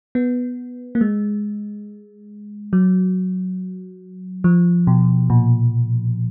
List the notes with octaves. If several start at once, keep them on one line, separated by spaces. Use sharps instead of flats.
B3
A#3
G#3
F#3
F3
B2
A#2